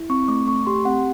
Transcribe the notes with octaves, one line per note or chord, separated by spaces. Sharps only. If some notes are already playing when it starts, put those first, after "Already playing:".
Already playing: E4
C4 C#6
A3 D6
A3 C#6
G4 C6
C4 F#5